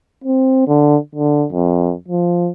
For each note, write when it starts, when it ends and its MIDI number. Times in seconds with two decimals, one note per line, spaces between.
0.24 0.65 60
0.67 0.96 50
1.15 1.45 50
1.52 1.93 41
2.08 2.49 53